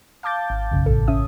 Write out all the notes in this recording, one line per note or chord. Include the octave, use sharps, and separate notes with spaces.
F5 A5 D6 G6 A6
G#1
B1 F#2 C#3
A1 A2 A4
C#4 E5 D#6